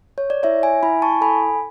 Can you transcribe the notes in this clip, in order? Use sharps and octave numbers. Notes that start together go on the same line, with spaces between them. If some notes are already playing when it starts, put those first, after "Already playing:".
C#5
D5
E4 C#5 E5
E5 G#5
E4 G#5 B5
A5 C#6
A4 G#5 B5